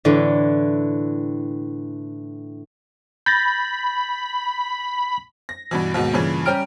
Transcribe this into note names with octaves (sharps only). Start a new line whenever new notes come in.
A2 D3 E3
B5 G6 A6 A#6
A#6
G2 B2 E3
D#2 G#2 B2
G2 A#2 C#3 E3
G3 C#4 G4 A#5 F6 D7